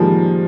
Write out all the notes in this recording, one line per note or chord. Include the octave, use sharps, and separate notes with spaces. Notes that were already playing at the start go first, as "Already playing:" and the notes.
Already playing: D#3 F3 G3 G#3 A#3